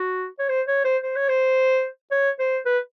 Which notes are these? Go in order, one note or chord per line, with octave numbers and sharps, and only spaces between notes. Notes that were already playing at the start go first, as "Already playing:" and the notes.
Already playing: F#4
C#5
C5
C#5
C5
C5
C#5
C5
C#5
C5
B4